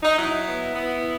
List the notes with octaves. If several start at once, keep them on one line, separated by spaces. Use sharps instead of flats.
D#4
F#3 E4
B3
B3